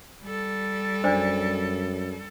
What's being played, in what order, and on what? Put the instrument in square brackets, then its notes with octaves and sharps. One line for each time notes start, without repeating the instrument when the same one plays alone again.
[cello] G3 A4
[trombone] F#2 [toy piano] D4 C5 D5